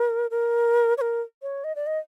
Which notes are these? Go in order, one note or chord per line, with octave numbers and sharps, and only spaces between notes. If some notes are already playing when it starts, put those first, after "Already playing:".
Already playing: A#4
A#4
C#5
A#4
C#5
D#5
D5
D#5